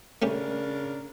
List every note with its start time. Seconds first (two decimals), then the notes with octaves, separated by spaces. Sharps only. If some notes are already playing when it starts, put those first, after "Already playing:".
0.22 C#3 A3 C#4 D4 G4 A#4